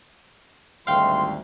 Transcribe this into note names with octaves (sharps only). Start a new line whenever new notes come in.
G#1 D2 G3 F5 G5 C6